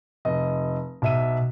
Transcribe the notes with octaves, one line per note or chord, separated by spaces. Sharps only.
F1 D#5
B1 E5 D#7